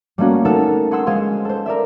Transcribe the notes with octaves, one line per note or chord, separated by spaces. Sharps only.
G3 A3 A#3 C#4 F#4
A3 D#4 A4 A#4 F#5
G#4 F#5 C6 E6 C7
G#3 G#4 C5 F5 C6
A4 C5
A#4 D5 E5